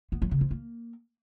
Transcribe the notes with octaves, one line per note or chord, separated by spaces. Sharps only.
B3
F#3
C#3
F3
A#3